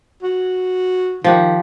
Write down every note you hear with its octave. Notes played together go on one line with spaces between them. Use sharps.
F#4
D#3 F3 G4 F#5